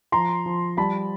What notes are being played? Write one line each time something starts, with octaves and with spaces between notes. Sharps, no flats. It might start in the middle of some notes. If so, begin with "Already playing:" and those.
F3 A#5 C6
F3
G3 A5 B5